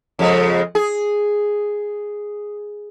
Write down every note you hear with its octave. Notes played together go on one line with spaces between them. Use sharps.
F2 C#3 G#3
G#4